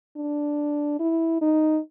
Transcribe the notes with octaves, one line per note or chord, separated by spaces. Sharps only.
D4
E4
D#4